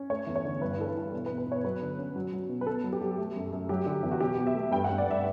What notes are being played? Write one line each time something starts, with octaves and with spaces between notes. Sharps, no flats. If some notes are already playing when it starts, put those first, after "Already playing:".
Already playing: C#4
A3 C#5
E2
C#5
D3
G2 B4
E3 A4
B4
E3
B2
B4
B2
B4
B2
C#5
F#3 B4
D3
C#4
F#3
F#3
B2
B4
B3 A4
F#3
G4
F#3
A3
F#2
F#2
F#3 G4
D3
E2
F#4
B2 G4
B2
E5
A3
G2 G5
F#5
G2
D5
G2 E5